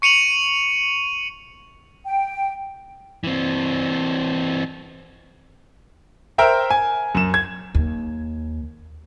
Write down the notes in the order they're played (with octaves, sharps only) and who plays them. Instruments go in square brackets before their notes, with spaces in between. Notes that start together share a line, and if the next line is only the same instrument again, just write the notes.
[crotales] C#6 C#7 D#7 F7 F#7
[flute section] G5
[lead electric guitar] E3 C4
[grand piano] A#4 C5 E5 G5 A#5
G#5
F#2 E7
G#6
[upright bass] D#2